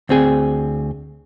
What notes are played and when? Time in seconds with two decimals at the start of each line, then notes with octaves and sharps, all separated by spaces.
0.09 D2 C4 G#4